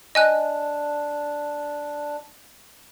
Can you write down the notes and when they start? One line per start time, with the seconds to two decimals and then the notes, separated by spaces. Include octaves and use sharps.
0.15 D4 D#5 G#5 F#6